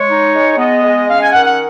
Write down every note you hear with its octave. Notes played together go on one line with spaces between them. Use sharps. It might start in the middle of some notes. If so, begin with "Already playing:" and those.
Already playing: G#3 C#5
D#4
G#3
B3 D#5
G#3
C#4 F5
G#5
D#3 F#5
F#5